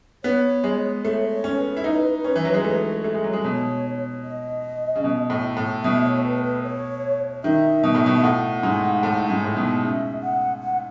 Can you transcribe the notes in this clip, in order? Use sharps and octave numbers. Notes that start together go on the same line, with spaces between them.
B3 C#5
G#3
A3 C#5
C#5
C#4
B4
E4
D#4
C#4
E3
F#3
G#3
A3
A3
G#3
F#3
G#3
B2 C#5
D#5
C#3
B2
A2
A2
B2 E5
C#5
B4
B4
C#5
D#3 E5
B2
A2
B2
E5
A2 F#5
G#2
A2
G#2
A2
B2
C#3 E5
F#5
F#5